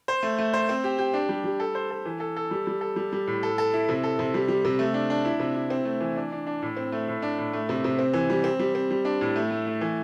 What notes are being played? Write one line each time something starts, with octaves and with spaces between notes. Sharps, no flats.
C5
A3
A3
C5
C4
G4
G4
D4
G3
G3
A4
C5
A4
E3
A4
A4
G3
G3
A4
G3
G3
A2
A4
A4
E4
C3
A4
C3
G3
G3
C3
A3
D4
D4
E4
C3
E4
C4
A3
E3
D4
D4
D4
A2
C4
A3
A2
D4
A2
A3
C3
C3
C4
E3
G3
C4
G3
C4
G3
D4
A2
A3
A3
A3
E3